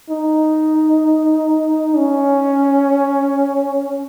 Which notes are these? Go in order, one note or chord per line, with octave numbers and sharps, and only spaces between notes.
D#4
C#4